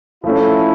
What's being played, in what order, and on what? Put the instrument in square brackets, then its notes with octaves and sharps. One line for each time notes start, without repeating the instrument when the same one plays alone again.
[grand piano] F3 A3 C#4 [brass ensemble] E4